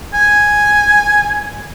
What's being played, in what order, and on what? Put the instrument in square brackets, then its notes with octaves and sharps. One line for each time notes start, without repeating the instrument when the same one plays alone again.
[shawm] G#5